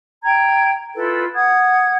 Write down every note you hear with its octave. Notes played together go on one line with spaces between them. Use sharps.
G5 A#5 G#6
E4 F4 A4 B4
F#5 D#6 G#6